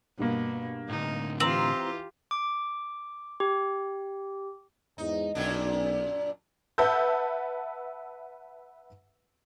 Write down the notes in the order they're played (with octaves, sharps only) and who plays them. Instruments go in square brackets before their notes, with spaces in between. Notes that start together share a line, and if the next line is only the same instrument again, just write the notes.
[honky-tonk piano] G2 A#3 [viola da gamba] B2
[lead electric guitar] A2 D3 [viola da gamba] D#4
[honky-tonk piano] E3 E4 A#5 [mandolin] C4 [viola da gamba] F4 G4
[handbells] D6
G4
[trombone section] E2 G#2 [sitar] D#4
[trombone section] B1 [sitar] F#2 A#2 D4
[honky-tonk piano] B4 E5 F#5 A5 E6 G6